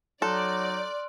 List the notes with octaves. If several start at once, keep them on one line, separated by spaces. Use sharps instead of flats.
F#3 D#4 A4 D5 C6 F6 F#6